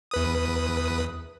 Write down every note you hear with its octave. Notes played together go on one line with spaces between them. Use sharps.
E2 B4 D#6